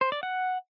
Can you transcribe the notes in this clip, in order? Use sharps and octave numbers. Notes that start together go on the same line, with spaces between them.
C5
D5
F#5